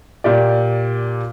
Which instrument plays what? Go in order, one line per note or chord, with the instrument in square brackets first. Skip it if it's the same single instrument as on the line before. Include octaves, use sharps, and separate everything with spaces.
[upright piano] A#2 G4 D5